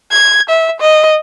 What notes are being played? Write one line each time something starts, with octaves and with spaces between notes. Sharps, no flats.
G#6
E5
D#5